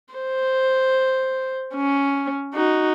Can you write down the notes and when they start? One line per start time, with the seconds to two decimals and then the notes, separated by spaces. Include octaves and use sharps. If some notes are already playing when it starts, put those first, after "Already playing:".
0.14 C5
1.75 C#4
2.54 D#4 F#4